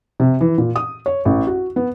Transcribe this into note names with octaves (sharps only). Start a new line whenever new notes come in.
C3
E3
A#2
D#6
C#5
A1
F#4
B3